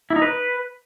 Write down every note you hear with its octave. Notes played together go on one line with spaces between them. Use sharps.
E4
D#4
B4